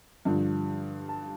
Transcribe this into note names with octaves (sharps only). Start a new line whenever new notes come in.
G2 D3 F3
A5